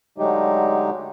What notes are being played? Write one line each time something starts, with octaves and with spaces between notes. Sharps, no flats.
D3 F#3 G#3 A3 D#4 G4